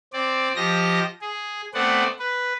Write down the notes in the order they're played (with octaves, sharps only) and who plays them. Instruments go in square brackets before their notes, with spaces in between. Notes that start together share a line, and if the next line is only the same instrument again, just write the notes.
[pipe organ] C4 D5
F3 G4 D#5 A#6
G#4
A3 B3 C4 D5 F#5
B4